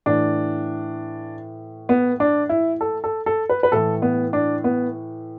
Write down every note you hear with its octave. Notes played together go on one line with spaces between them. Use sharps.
A2 E3 D4
B3
D4
E4
A4
A4
A4
B4
B4
A2 E3 A4
B3
D4
B3